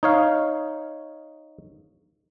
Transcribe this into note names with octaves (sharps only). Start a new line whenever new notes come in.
D#4 C#5 F5